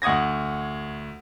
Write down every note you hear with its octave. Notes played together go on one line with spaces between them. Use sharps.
D2 F#5 D#6 G#6 A#6